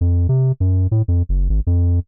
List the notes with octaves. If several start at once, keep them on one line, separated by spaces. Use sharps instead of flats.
F2
C3
F#2
A2
F2
F#1
G#1
F2